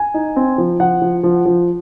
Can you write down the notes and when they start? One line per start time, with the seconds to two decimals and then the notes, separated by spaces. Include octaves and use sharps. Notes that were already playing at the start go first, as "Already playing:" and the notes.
Already playing: G#5
0.14 D#4
0.36 C4
0.58 F3
0.80 F3 F#5
1.02 F3
1.23 F3
1.46 F3